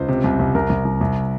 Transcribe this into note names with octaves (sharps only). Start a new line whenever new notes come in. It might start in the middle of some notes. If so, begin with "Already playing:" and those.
Already playing: C#2 C5
C3
C2
C2
C2 A#4
C2
C2
C2